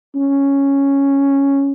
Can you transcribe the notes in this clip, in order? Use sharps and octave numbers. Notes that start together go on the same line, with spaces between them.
C#4